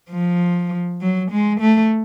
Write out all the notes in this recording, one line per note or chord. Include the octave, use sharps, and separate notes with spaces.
F3
F#3
G#3
A3